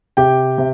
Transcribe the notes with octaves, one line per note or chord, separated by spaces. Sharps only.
C3 G4 G5
C3